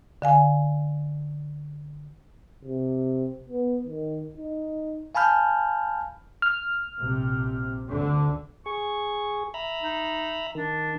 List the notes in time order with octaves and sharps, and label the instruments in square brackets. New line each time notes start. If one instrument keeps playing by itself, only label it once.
[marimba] D3 F5 G#5
[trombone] C3
B3
D#3
D#4
[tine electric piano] F5 G#5 A5 B5 F6 G6
[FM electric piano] F6
[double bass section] A#1 C3
D2 D3
[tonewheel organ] G#4 [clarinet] C#6
[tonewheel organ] E5 A#5 B5
[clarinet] D#4
[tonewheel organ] D#3 [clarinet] D4